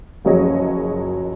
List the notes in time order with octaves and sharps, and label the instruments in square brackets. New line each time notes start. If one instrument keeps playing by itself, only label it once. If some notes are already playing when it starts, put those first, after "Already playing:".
[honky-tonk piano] F#1 F3 F#3 G#4 C#5 D#5